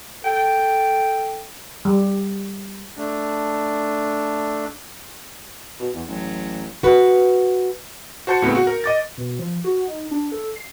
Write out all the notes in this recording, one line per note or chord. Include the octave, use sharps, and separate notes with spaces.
A4 G5
G3
A3 D4
B2
E2
A1 F#3
F#4 B4
F#4 C5 A5 G6 C#7
A2 C#3 B3 C4
F#4
A#4
D#5 D6 A6
B2
F3
F#4
D#4
D4
A4
C7